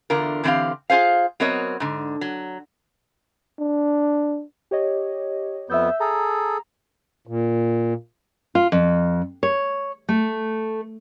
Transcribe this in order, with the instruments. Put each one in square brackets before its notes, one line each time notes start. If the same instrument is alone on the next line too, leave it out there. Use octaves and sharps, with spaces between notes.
[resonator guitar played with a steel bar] E2 D3 F4 A#4
D3 E3 C4 F#4 G4 F5
F4 G#4 C5 F5
F#3 B3 C4 A#4 C#5 D#5
G#2 D3
F#3
[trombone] D4
[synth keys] G4 C#5 D#5
[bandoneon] F2 B3 [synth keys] E5 E6 G6
[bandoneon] G#4 A4 [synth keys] A#5
[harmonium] A#2
[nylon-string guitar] F4
F2
C#5
A3